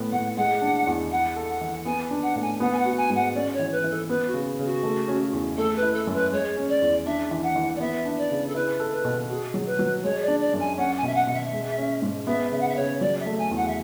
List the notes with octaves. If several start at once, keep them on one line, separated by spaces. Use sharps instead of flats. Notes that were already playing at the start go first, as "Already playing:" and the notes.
Already playing: A2 B3
A2 F#5
G#3 F#5
D4
E2
E4 F#5
A4
F#5
E3
B3 G#5
D4
F#5
A2
G#5
B3 F#5
G#5
F#5
F#4
G#5
G#2
F#5
C#4 D5
C#5
E3
B4
E3
A4
B3 B4
F#4
C#3
C#3
F#4
A3
C#4
E2
A3 A4
B4
E4
A4
F#2
B4
G#3 C#5
C#4
D5
E2
D4 E5
E3
F#5
E3
D5
B3 E5
D4
D5
C#3
A4
E4 B4
A4
B4
B2
F#4 G#4
F#3
B4
F#3
G#3 C#5
D5
D4
D5
F#2
G#5
C#4 F#5
G#5
B2 E5
F#5
B2
E5
G#3
C#4
G#2
B3 E5
C#3 E5
F#5
E5
C#3 C#5
F#3 D5
E5
A3
G#5
E2
F#5
E5